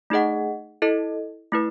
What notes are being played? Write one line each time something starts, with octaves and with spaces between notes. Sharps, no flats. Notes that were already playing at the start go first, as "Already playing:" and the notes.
A3 D#4 G#4 D#5 F#5
E4 A4 D#5
A3 E4 B4